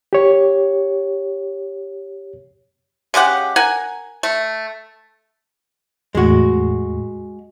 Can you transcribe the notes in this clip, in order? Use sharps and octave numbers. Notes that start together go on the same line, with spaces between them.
G4 C#5
C#3 G#3 G4 F#5
A#4 F#5 G#5
A3
E2 A2 G#3 A3 F#4